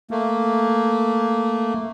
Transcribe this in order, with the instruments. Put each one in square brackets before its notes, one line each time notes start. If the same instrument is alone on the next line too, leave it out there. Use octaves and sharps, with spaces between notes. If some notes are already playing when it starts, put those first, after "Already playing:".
[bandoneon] A3 A#3